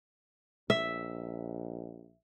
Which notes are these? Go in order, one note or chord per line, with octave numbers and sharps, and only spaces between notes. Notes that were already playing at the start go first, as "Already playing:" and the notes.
A#1 E5